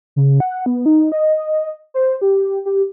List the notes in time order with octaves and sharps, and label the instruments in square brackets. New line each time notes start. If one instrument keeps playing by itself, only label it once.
[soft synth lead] C#3
F#5
B3
D#4
D#5
C5
G4
G4